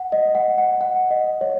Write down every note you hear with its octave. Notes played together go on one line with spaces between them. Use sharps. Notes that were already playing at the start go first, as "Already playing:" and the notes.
Already playing: F#5
D#5
F#5
F#5
F#5
D#5
C#5